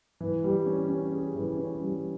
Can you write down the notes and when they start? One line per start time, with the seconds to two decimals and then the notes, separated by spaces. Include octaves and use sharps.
0.21 E3
0.44 G3
0.66 C#4
0.89 C#4
1.12 G#4
1.35 E3
1.58 C#4
1.81 G3